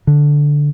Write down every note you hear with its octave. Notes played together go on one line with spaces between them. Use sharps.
D3